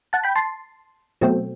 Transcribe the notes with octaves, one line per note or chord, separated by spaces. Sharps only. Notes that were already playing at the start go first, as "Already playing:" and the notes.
F#5 A5
G5 B5
A5 C6
B2 F#3 A3 C4